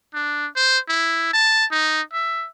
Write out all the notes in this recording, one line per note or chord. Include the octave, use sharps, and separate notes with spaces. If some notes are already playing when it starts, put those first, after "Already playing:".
D4
C5
E4
A5
D#4
E5